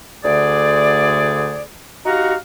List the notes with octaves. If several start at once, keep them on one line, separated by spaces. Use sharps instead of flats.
D2 D3 A3 G#4 D5
D#4 F#4 G4 F5 F#5 A#5